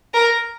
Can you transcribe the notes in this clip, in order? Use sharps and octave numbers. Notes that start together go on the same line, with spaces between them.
A#4